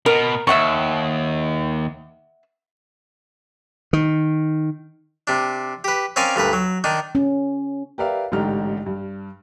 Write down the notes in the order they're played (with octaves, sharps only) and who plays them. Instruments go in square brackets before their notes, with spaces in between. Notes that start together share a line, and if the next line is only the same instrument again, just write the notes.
[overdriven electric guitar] B2 [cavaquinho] A#4
[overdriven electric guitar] D#2 [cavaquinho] E5 F#5 C#6
[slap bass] D#3
[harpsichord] C3 D4
G4 B4
C4 C#4 A#4 D5 F5 G#5
D2 G2 A#4 B4
F#3
D#3 D4 D#4
[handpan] C#4
[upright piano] G4 A#4 B4 D5 E5 F5
A1 G#2 D3 D#4 G4 F6
G2